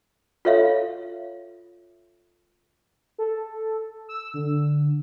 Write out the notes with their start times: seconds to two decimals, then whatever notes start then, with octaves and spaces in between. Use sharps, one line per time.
0.45 F4 A4 C#5 E5 F5
3.18 A4
4.08 E6
4.34 D3